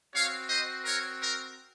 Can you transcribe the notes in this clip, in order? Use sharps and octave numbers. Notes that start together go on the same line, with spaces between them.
C4 F#4 C#5 F5
C5 D#5
A#4 C#5
A#4